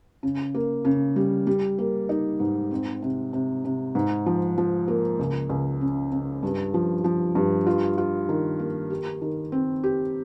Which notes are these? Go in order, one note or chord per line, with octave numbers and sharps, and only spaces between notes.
C#3
A#3
C#3
G3
G3
A#3
D#4
G#2
C4
C3
C3
C3
G#2
F3
F3
A#3
C#2
C#2
C#3
C#3
G2
F3
F3
G2
F4
F4
D#3
A#3
G4
D#3
C4
G4